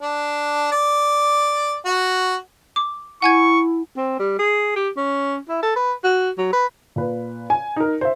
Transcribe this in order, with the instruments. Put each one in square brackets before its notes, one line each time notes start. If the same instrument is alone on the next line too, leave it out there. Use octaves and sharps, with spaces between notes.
[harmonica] D4
D5
F#4
[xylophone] D6
[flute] E4 [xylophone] F#5 G#5 G#6 [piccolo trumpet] C#6
[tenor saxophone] C4
G3
G#4
G4
C#4
E4
A4
B4
F#4
F#3
B4
[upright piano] A#2 B4
G#5
D#4 A#4
C5 E5